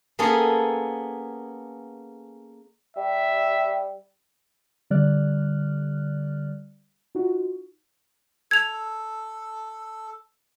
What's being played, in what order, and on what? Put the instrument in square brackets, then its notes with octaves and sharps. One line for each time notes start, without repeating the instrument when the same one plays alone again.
[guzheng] A#3 B3 C#4 G#4 A4
[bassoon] G3 [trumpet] E5
[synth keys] D3 G3 D5 F6 F#6
D#4 F4 F#4
[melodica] A4 [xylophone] G#6 F7